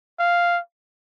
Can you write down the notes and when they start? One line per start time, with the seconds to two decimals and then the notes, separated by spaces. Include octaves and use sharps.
0.19 F5